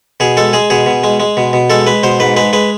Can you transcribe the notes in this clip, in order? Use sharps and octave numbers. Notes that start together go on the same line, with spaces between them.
B2 G#4
G#3 A4
G#3 G#4
B2 G#4
B2
G#3
G#3
B2
B2
G#3 A4
G#3 B4
B2 C5
G#2 B4
G#3 B4
G#3 B4